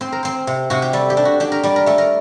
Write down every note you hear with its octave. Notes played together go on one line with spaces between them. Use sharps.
C4 C5
A#4
C4 C5
C3
C3 F#4
G4
G3 A4
G4
D4
F#4
D4 G4
A#4
G3 D5
A#4
A3 A4
A#4